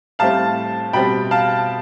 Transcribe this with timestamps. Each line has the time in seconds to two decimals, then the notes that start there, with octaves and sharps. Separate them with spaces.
0.19 A2 G3 C4 F5 A5
0.93 B2 G3 C4 G5 B5
1.31 F5 A5